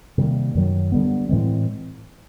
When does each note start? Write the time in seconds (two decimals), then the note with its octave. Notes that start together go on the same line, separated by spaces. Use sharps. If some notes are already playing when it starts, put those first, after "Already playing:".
0.18 C3 D#3 G3 A#3
0.55 F#2 D#3 F#3
0.92 D3 G3 B3
1.29 A2 E3 G#3 C4